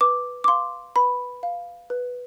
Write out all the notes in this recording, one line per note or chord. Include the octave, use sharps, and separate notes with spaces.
B4 D6
D6
F5 C6
B4 B5
F5
B4